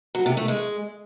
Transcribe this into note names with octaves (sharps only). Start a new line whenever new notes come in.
F#3
C3
A3
G#3